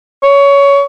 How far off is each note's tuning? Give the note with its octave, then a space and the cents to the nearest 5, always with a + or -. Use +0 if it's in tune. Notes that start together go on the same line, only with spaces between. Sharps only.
C#5 +20